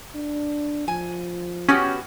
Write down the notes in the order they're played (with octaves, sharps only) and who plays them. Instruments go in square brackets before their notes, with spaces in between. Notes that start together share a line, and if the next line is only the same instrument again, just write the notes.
[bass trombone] D4
[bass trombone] F3 [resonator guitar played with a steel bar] G#5
[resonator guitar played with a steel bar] B3 F#4 G4 [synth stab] C#4